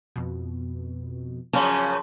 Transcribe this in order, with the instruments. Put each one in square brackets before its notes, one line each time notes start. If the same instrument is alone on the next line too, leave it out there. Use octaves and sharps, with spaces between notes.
[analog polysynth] F2 B2
[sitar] F#2 C#3 F3 [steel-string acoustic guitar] C#4 [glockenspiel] A5 C6